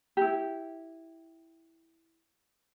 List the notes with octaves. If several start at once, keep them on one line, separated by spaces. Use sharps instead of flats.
E4 G4